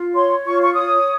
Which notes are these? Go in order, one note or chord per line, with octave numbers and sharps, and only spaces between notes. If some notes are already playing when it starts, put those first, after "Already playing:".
Already playing: F4
C#5 C6
F4 C#6
C#6
C#5 D#6